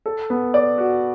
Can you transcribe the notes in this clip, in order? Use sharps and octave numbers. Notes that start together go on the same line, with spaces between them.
A4
B3
D5
F#4